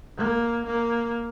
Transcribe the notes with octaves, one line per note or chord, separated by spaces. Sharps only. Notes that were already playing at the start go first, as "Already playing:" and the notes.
A#3
A#3